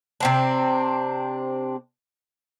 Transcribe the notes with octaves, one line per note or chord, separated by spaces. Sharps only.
C3 C4 D4